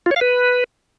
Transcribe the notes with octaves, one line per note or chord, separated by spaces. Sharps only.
F4
C#5
F5
B4